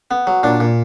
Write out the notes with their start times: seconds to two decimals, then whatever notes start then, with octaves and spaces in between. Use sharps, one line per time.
0.11 B3
0.27 F#3
0.43 A#2 D4
0.60 A#2